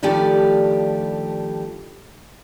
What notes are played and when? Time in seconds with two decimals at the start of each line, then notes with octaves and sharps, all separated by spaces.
0.03 G2 D#3 F3 A3 G4 D5